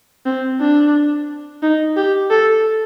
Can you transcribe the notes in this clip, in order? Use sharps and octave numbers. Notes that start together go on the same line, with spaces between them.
C4
D4
D#4
G4
A4